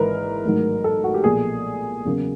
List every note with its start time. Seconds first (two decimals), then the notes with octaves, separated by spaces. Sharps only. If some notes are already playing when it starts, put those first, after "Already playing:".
Already playing: G#1 G#2 E3 A#4 B4
0.44 A1 G#2 D#3 F#3
0.84 A4
1.04 F#4
1.14 G4
1.24 B1 A#2 F3 A3 G#4
2.05 E2 C#3 F#3 A#3